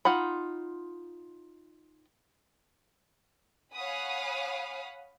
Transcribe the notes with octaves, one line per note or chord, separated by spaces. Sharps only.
D#4 F4 F#5 B5
C#5 F5 F#5 G#5 B5 D#6